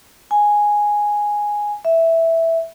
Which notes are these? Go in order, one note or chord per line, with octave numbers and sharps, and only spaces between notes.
G#5
E5